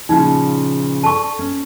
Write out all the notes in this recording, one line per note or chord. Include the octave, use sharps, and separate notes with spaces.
A#2 C#3 F3 D#4
A4 D5 A5 C#6
C#4